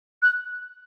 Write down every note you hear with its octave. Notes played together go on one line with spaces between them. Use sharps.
F#6